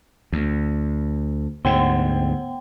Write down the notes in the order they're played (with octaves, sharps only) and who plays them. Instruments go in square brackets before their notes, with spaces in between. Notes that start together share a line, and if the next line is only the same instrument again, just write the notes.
[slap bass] D2
[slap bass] D2 G#2 [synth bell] B3 F#5 G5